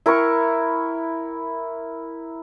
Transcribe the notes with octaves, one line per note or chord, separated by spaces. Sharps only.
E4 A#4 G5 C#6